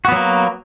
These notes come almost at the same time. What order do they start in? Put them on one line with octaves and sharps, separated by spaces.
F#4 B3 F#3 A#3